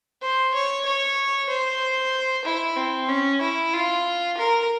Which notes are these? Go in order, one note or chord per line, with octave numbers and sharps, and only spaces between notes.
C5
C#5
C#5
C5
E4
C4
C#4
E4
F4
A#4